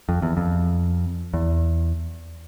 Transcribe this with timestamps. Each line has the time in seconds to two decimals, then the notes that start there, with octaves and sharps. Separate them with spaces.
0.09 F2
0.22 E2
0.37 F2
1.34 E2